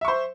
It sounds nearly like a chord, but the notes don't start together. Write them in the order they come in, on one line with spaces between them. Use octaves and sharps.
E5 C#6 C5